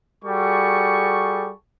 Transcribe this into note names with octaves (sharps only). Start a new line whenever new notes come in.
G3 F#4 G#4 A4 C#6